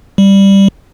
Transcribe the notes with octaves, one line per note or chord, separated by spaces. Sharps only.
G3